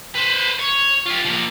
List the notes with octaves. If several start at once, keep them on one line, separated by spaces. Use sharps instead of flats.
B4 C5
C#5
F4 G4
F3 A#3